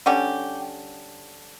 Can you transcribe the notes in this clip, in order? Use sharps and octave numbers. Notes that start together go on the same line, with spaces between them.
D3 G3 C#4 G4